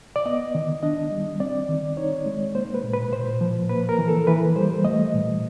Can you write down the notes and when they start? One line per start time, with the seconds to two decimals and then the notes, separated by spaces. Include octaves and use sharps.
0.16 D5
0.26 B3 D#5
0.55 D#3
0.83 D4 D#5
1.11 G3
1.40 C4 D5
1.69 D#3
1.97 D#4 C#5
2.26 G#3
2.55 A#3 C5
2.74 B4
2.84 A#2
2.93 B4
3.12 A#2 C5
3.41 F3
3.69 A#3 B4
3.89 A#4
3.99 E3
4.08 A4
4.27 E3 B4
4.56 G3 C5
4.85 A3 D#5
5.14 A#2